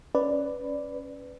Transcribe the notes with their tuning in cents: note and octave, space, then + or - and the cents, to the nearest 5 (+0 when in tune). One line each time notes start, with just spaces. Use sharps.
C#4 +0 B4 +10 D5 +0